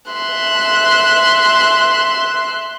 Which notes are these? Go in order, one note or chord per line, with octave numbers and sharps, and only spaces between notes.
E5 C6 F#6